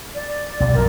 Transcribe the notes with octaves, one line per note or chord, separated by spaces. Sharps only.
D5
B1
F#2 F3 A#4